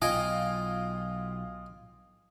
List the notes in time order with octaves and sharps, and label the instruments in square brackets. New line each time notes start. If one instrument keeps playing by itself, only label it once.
[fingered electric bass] B1 [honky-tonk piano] F4 [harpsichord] D#5 G5 G#5